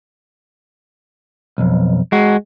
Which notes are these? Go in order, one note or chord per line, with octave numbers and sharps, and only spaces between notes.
B1 F2
G#3 F#4